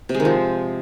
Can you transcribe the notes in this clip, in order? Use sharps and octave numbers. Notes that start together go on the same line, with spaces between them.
C3
G#3
D#3
F3